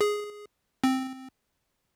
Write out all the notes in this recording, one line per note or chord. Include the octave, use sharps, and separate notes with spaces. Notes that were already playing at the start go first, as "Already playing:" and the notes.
G#4
C4